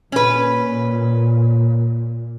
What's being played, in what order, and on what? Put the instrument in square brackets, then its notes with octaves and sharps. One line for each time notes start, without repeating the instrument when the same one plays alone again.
[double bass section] A#2 [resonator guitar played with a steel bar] C#4 B4